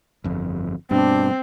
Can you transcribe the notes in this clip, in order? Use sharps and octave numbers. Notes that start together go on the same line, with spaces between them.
G1 F2
G2 B2 C4 D4